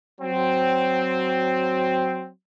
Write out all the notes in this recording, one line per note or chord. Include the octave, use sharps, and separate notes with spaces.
F#3 C4